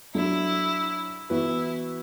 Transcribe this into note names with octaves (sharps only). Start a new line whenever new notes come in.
F#3 D4 E4 A4
E3 B3 E4 F#4 B4